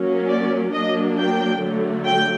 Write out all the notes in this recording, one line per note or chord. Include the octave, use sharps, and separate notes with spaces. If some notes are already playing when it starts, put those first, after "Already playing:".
Already playing: F#3 A#3 C#4
D5
F#3 A#3 D4 D#5
G5
D3 F#3 A3
G5